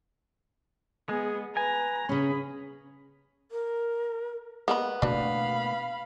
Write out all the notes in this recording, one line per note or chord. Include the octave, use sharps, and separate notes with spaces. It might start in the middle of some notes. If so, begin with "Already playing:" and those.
G#3 B3 G#4
B4 G#5 A#5
C#3 C#4 G#4 B5
A#4
G#3 A#3 B3 B5
B2 A3 A#3 D4 F#4 F5 B5